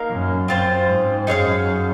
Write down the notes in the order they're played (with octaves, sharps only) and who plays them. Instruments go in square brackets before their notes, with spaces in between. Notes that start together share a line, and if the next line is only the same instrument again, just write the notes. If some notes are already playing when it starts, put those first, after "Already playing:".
Already playing: [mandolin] A#3 D#4 A#4 F5
[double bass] F#2
[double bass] F#2 [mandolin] C4 F4 C5
[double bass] G#2
[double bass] F#2 [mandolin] D#4 G#4 C#5 F5